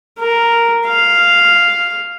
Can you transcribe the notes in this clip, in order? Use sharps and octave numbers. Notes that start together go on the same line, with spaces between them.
A#4
F5